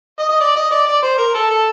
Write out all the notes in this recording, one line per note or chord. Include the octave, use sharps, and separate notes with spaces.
D#5
D#5
D5
D#5
D5
D5
C5
A#4
A4
A4